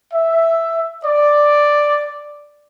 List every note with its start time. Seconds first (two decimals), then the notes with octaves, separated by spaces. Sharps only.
0.13 E5
1.05 D5